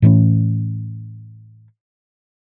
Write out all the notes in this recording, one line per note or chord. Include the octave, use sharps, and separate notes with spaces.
A2 E3 A3 C#4